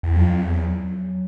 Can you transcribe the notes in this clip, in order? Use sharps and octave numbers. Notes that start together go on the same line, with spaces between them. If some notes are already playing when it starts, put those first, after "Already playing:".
E2
F2 F#3
F3
F#3
E2
F3
F#3